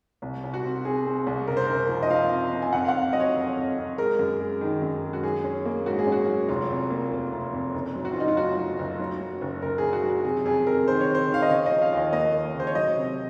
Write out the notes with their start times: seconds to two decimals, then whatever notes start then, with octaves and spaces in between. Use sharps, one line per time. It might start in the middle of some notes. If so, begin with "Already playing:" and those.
0.22 C2
0.43 C2
0.54 F#4
0.64 C4
0.85 C4 G#4
1.06 C4
1.26 C2
1.47 F#1 A#4
1.57 C5
1.66 F#1 A#4
1.89 F3
2.03 D#5
2.10 F3 F5
2.31 C4
2.52 C4
2.62 G#5
2.73 F2 F#5
2.85 F5
2.88 F#5
2.94 F2
3.13 F#3 D#5
3.20 C#5
3.35 F2
3.57 F2
3.78 F2
3.98 G#3 A#4
4.19 F#2
4.40 G#3
4.61 D#3
4.82 F#2
5.02 G#3
5.13 F#4
5.23 F#3 G#4
5.44 C#4
5.65 A#3
5.86 G#2 F#4
5.99 G#4
6.07 C#4
6.12 F#4
6.28 F#3
6.48 F1 F4
6.70 F2
6.90 A#3
7.11 F1
7.32 F1
7.53 F2
7.74 F#1
7.95 F#3
8.05 F#4
8.13 F4
8.16 F#1 D#4
8.28 F4
8.37 F#3 F#4
8.57 F#3
8.79 F#1
8.99 F#3
9.21 F#3
9.41 F#1
9.62 F#1 A#4
9.78 C#3 G#4
9.93 F#4
10.03 F#3
10.10 F#4
10.25 C3 G#4
10.45 F2 G#4
10.66 F2 A#4
10.87 D#3 C5
11.01 C#5
11.09 D#3
11.15 C5
11.30 D#3 F5
11.42 D#5
11.50 C#3 C#5
11.66 D#5
11.71 F3
11.82 F5
11.92 D#2
11.97 D#5
12.12 A#3 D#5
12.34 D#2
12.54 C#3
12.60 C5
12.67 C#5
12.75 F#3 D#5
12.96 C3